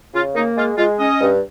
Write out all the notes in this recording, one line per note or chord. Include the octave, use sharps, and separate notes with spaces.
C#3 F4
A#3 D#4
G#3 F4
G#3 F4
C#4 D#5
G2